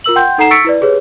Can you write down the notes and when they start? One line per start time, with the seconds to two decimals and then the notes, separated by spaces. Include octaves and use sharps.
0.04 F4 A#4 E6 F#7
0.16 F#5 G5 C6 G6
0.38 D#4 A4 F#5 A#5 C7 E7
0.51 C#6 E6 A6 B6 C#7 D7
0.65 E4 B4 D5
0.81 G4 G#4 B4 C#5